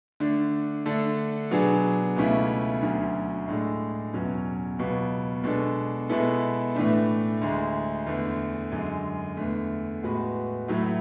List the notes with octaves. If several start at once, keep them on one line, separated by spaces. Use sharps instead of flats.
D3 A3 D4
D3 A3 D4 A4
B2 F#3 B3 D4 G#4
C#2 B2 A3 C#4 E4
D2 D3 F#3 C#4
A2 G#3 D4 A4
E2 B2 F#3 C#4
C#2 B2 F#3
B2 G#3 D4 A4
B2 G#3 B3 E4 A4
A2 E3 A3 D4
D2 D3 G#3
E2 D3 A3
F#2 D3 G#3
E2 D3 A3
A2 G#3 B3 F#4 B4
A2 F#3 A3 E4